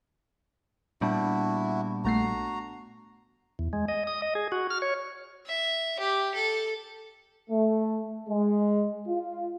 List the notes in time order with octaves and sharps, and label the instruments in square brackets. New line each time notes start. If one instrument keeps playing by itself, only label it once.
[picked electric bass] A#2 G3 [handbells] B3 D4 A5 [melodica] E4 F#4
[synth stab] A#1 A3 C7 [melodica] F#4 A#5
[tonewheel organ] E2
G#3
D#5
D#6
D#5
G#4
F#4
F6
C#5
[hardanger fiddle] E5
G4
A4
[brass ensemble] A3
G#3
F4